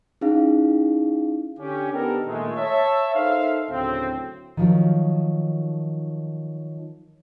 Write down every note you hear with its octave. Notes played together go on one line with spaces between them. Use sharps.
C#4 D#4 E4 G#4 F5
D3 C#4 G4
B3 D4 D#4 G4 A4 A#4
A#2 D#3 G#3 A3
C#5 E5 A5
D#4 A4 A#4 C5 E5 F5
D2 A2 C#3 F#3 C4
D#3 F3 F#3